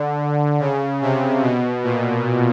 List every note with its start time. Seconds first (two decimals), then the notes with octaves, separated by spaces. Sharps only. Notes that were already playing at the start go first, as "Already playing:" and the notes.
Already playing: D3
0.60 C#3
1.01 C3
1.42 B2
1.84 A#2